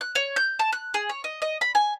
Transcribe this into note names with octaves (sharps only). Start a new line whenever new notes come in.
F#6
C#5
G6
A5
F#6
G#4
C#5
D#5
D#5
B5
G#5